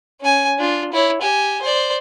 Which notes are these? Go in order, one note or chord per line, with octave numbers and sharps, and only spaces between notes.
C#4 G#5
D4 F4
E4 C#5
G4 G#5
C5 D5